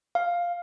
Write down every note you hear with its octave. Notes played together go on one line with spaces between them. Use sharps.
F5